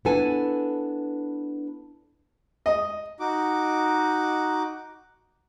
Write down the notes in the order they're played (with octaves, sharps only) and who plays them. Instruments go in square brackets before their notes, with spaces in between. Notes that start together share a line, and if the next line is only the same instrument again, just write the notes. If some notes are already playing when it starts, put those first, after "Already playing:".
[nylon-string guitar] B3 D4 E4 A4 B4 G#5
[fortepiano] D#5
[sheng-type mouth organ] D#4 F#4 D6